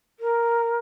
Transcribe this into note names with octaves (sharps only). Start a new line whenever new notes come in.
A#4